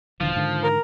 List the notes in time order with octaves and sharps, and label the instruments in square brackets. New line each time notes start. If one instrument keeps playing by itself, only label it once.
[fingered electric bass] D#1 D3 E3 [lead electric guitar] F3
[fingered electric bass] G#2 D3 D#3
[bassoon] A#4